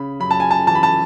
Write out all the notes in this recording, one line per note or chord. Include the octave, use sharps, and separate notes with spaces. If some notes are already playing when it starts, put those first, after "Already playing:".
Already playing: C#3 B5
F#2 B5
A5
G#5
A5
E3 A5
B5
A5